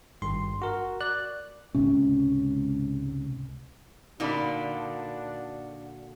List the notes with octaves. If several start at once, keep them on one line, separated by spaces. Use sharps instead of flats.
G#1 G2 C6
F#4 A#4
D5 F#6
C#2 G#2 C3 C#4
A#2 D3 D4 D#4 F#4 D5 B5